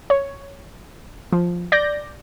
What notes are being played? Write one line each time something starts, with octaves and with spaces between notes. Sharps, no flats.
C#5
F3
D5 G6 A#6